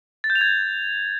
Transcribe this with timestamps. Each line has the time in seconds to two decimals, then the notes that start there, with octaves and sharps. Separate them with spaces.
0.24 A6
0.30 G6
0.35 F7
0.41 G#6